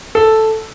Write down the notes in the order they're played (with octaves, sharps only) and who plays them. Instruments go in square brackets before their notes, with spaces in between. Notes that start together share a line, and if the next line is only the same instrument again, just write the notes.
[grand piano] A4